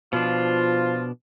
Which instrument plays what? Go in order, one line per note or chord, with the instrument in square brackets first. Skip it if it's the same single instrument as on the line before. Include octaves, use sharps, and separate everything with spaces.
[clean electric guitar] B2 D4 [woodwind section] F3 F4